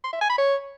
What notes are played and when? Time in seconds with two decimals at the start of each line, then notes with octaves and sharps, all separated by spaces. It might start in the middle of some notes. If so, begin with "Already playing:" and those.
0.04 C6
0.12 E5
0.21 G#5
0.29 B5
0.38 C#5